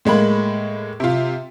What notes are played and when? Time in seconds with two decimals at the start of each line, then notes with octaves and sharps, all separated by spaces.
0.05 A2 G#3 A#3 B5
1.00 C3 F4